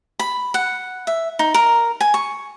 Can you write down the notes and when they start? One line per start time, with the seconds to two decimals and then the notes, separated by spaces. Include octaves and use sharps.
0.19 B5
0.54 F#5
1.07 E5
1.39 D#4
1.54 A#4
2.00 G#5
2.14 C#6